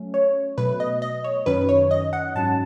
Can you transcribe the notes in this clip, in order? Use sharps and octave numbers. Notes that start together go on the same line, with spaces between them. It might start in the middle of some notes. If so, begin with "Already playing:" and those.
Already playing: F#3 A3 C#4
C#5
B2 F#3 A3 B4
D#5
D#5
C#5
F#2 D#3 F#3 C#4 B4
C#5
D#5
F#5
G#2 F#3 C#4 A5